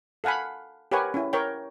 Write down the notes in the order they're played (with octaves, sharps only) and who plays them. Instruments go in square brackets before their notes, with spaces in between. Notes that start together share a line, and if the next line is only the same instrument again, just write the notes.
[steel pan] A4 F5 F#5 G#5 B5
G4 A#4 B4 C#5 F#5 G#5
C#4 E4
A#4 C#5 G5